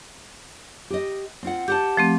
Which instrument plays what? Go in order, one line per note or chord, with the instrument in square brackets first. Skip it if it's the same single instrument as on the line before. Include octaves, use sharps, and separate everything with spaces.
[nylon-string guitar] G4 D#5
C4 F4 F#5
[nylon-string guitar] G4 F#5 A5 [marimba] G6
[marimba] F3 A3 C4